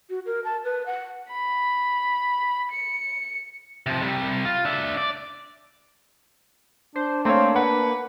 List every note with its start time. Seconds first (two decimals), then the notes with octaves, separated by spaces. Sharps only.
0.10 F#4
0.26 A#4
0.44 A5
0.64 B4
0.86 F#5
1.32 B5
2.72 C#7
3.86 C3 F3
4.02 C3 G3
4.45 F4
4.65 D4 E5
4.97 D5
6.96 D4 C5
7.25 A3 A#3 C4 C#5
7.56 B4 F#5